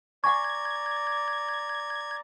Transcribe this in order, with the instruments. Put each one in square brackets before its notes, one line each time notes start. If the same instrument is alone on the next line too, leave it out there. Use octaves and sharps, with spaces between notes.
[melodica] D5 A#5 [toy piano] F#5 G#5 C#6 [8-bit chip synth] G#6